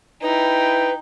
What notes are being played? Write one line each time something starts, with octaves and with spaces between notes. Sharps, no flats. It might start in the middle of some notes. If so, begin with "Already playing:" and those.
D#4 E4 B4 G5